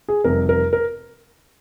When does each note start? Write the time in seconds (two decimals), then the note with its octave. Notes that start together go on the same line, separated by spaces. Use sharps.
0.09 G#4
0.24 F1 F2 C3 G3 A#4
0.49 A#4
0.73 A#4